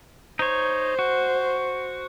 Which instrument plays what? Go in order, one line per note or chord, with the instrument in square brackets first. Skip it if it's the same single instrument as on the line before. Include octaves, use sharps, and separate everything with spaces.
[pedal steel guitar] D#4 C#5 [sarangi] C5
[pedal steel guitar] F#4